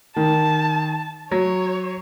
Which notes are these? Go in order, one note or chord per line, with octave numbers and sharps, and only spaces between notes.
D#3 A5
F#3 C#5